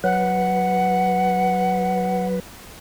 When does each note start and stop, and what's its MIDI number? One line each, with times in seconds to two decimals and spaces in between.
0.04 2.40 54
0.04 2.40 71
0.04 2.26 78